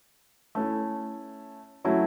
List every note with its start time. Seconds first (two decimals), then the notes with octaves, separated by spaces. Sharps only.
0.55 A3 C#4 E4
1.84 F#3 A3 C#4 E4